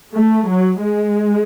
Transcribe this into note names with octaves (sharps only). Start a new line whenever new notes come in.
A3
F#3
G#3